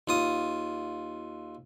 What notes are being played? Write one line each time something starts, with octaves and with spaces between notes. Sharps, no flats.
D#2 F4 D#6